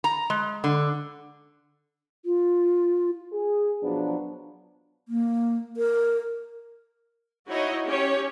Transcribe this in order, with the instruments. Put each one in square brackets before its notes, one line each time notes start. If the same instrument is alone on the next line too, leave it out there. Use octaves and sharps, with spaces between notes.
[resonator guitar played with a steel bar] A#5
G#3
D3
[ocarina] F4
[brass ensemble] G#4
B2 F3 F#3 B3 D4
[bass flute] A#3
A#4
[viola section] D#4 E4 F#4 C#5 D#5
C#4 G4 C#5